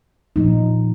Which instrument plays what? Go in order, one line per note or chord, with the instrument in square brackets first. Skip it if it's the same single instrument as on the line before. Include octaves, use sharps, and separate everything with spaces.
[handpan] A#2 F3 A#3 D#4